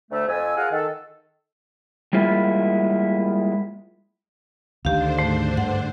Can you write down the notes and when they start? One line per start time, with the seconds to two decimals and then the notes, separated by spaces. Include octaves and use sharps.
0.11 D2 A3 E5
0.28 F2 G#5 E6
0.57 F4 G#4 A#4 F5 F#5
0.72 D#3 A4
2.13 G3 G#3 A#3 E4 F4
4.85 D2 D3 D#3 D4 G4 C5 F5
5.18 G#2 A3
5.57 G2 F#5